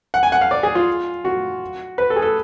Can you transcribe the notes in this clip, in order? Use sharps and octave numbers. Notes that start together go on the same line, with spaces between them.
F#5
G#5
F#5
F5
D5
G#4
F4
F#4
B4
A4
G#4
A4